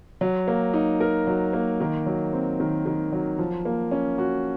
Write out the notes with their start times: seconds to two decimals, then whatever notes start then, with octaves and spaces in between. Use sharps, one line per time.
0.21 F#3
0.48 A#3
0.74 D#4
1.00 A#4
1.27 F#3
1.53 A#3
1.80 D#3
2.06 F#3
2.33 C4
2.60 D#3
2.86 D#3
3.12 F#3
3.39 F3
3.65 A#3
3.91 C#4
4.18 F#4